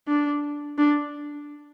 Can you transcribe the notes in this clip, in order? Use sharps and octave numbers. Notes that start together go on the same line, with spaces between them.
D4
D4